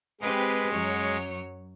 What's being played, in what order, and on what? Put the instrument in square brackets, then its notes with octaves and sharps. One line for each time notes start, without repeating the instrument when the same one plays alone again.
[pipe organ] G#3 [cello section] C4 G4 B4
[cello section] F#2 F#3 C#5